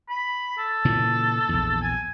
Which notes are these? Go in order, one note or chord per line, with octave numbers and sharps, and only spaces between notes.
B5
A4
A#2 C#3 E3
A#1 E2
G#5